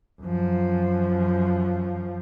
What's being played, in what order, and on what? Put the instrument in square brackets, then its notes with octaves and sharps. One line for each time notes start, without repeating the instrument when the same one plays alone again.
[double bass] F#2 F3